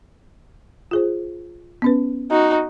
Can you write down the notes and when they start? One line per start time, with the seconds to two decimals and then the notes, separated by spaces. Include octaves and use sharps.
0.91 F4 G#4 C5
1.82 B3 C#4 B4
2.31 D#4 F#4